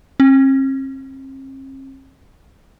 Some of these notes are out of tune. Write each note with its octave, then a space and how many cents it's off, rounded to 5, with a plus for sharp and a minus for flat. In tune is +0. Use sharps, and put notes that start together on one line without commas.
C4 +45